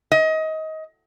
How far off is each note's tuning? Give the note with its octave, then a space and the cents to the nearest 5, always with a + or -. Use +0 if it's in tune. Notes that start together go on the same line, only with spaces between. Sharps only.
D#5 +25